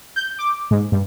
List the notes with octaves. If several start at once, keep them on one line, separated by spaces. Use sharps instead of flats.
G6
D6
G#2
G2